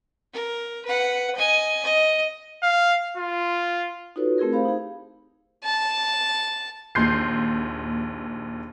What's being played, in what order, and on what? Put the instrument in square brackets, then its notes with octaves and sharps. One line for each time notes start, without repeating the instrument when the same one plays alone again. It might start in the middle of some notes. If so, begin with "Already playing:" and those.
[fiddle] A#4
B4 F#5
D#5 G#5
D#5
[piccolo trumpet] F5
F4
[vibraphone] D#4 F4 F#4 A4 B4 C#5
A3 C4 E4 G#4 A#4
G4 C5 F5 B5
D#4 G#4
[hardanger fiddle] A5
[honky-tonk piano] A#1 D#2 C6 G6 C7